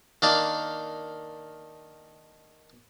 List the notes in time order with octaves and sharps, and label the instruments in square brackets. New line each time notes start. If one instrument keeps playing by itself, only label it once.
[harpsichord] D#3 A#3 D4 D5 F5